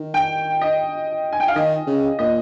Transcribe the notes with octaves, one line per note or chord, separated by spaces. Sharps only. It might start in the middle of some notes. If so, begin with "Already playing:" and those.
Already playing: D#3
G5
D#5
G#5
G5
F5
D#3 D#5
C#3
A#2 D#5